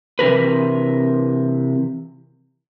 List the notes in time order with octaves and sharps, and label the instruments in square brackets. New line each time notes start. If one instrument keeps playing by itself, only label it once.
[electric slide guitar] C3 E3 A#4 B4